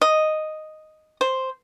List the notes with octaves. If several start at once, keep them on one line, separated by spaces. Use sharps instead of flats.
D#5
C5